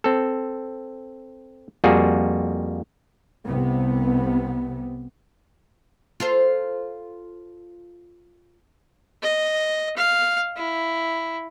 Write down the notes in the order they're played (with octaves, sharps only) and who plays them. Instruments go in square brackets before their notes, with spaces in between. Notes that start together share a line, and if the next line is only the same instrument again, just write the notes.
[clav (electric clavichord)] C4 A4
F2 G3 A#3 F4 F#4 G#4
[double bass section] C2 C3 B3
[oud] F4 A4 C5
[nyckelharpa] D#5
F5
E4